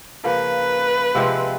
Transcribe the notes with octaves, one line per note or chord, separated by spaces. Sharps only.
C#3 F3 A#3 B4
C3 F3 G#3 C4